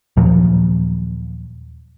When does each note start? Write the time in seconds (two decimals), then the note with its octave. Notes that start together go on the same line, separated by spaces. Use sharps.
0.17 D#2 A#2 F3 F#3